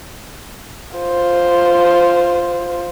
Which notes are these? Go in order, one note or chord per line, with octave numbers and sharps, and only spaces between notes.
F4 C5